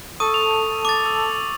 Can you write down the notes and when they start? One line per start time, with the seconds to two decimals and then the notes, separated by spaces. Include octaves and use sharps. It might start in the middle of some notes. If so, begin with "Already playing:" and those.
0.20 A4 C#6 D#6
0.34 F7
0.85 D6 A6
1.06 E6